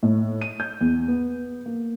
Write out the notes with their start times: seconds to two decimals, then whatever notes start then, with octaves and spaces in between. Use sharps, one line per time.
0.03 A2
0.41 D#7
0.60 G6
0.81 E2
1.08 B3
1.66 A#3